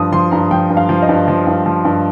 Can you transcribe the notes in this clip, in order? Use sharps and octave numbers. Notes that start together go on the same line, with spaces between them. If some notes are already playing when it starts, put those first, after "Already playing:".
Already playing: G2 F3 D#6
F3 C6
G2 A#5
F3 G5
G2
F5
F3
D#5
G2
F3
G2
F3
G2